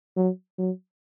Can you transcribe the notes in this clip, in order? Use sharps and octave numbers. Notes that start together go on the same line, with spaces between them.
F#3
F#3